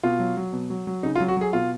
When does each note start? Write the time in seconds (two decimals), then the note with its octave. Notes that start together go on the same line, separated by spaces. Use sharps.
0.03 B2 F4
0.19 F#3
0.37 F#3
0.53 B2
0.70 F#3
0.87 F#3
1.03 C#3 D#4
1.15 F4
1.20 F#3
1.28 F#4
1.37 F#3 G#4
1.53 B2 F4